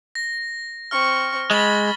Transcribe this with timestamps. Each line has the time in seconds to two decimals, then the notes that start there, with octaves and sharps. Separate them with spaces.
0.15 A#6
0.91 C4 C#6 F6
1.51 G#3 B5 C#6 A6 G7